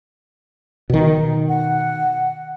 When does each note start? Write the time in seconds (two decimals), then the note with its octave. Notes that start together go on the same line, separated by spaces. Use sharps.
0.90 B2 D#3
1.49 F#5